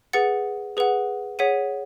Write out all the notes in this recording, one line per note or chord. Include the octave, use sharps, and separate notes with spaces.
G#4 B4 F#5 A6 C#7
G#4 B4 F#5
G#4 C#5 F#5 B6 D#7